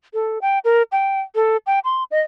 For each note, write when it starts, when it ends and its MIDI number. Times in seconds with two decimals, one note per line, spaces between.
0.14 0.39 69
0.42 0.59 79
0.65 0.83 70
0.92 1.20 79
1.35 1.57 69
1.67 1.79 79
1.85 2.04 84
2.11 2.20 75